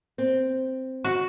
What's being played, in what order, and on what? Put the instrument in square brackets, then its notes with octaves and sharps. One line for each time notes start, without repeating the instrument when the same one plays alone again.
[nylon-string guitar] C4
[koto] F#4